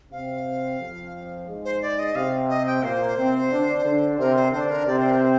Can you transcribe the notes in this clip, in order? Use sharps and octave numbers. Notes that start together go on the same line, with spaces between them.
C3 C4 F5
F2 F3
G#2 G#3
C5
D5
D#5
C3 C4 F5
D#5
G5
A#2 A#3 C5
C3 C4
D3 D4
D3 D4
C3 C4 A#4
C5
D3 D4 C5
A#4
C3 C4 D5
C5
A#4
C5